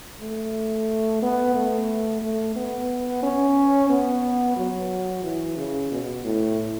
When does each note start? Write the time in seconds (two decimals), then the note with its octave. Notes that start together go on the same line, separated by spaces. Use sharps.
0.21 A3
1.22 B3
1.55 A3
2.22 A3
2.56 B3
3.23 C#4
3.89 B3
4.56 F#3
5.23 E3
5.57 C#3
5.91 B2
6.24 A2